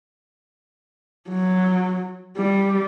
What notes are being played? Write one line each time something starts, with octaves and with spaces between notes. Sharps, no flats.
F#3
G3